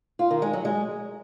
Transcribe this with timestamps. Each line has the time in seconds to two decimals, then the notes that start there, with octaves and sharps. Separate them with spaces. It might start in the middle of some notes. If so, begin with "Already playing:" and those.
0.19 F4
0.31 D#3
0.42 G#3
0.53 F#3
0.65 G#3